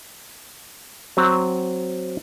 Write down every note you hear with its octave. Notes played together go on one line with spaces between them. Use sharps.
F#3 C4